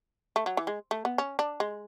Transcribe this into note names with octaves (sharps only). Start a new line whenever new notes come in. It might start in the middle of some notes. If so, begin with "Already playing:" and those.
A3
F#3
E3
G#3
A3
B3
C#4
D4
G#3